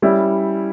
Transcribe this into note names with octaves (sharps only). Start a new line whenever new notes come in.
G3 C#4 E4